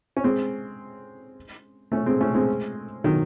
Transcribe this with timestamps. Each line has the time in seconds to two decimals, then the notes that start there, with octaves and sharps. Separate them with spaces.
0.17 C#4
0.24 G#3 C4
1.92 A3 C#4
2.06 G#3 C4
2.21 A3 C#4
2.34 G#3 C4
3.04 D#3 F#3